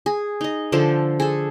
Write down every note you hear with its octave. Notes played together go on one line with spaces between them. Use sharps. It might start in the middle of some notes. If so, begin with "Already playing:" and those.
G#4
D#4 D#5
D3 F3 A4 C5
G#4 A4